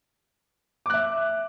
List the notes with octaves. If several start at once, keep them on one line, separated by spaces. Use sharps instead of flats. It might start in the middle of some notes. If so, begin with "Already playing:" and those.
E5 D6 F#6